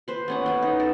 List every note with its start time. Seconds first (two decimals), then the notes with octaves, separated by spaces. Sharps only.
0.08 B4 C5
0.28 B3 C#4 F#5
0.46 B3 B4
0.62 D#4
0.80 A4